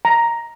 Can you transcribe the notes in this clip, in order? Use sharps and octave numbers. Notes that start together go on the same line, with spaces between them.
A#5